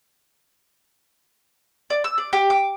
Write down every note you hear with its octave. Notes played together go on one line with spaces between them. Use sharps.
D5
E6
D5
G4
D6